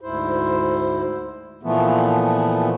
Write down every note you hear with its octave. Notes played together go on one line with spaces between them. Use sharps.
D2 G#2 E4 C5
A#2 E3 F3 A3 B3